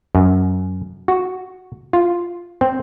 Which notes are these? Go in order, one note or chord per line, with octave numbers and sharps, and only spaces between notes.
F#2
F#4
F4
C4